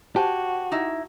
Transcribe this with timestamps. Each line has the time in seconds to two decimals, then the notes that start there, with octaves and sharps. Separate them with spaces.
0.16 F#4 G4 C5 G#5 A5
0.72 D#4 E4 E5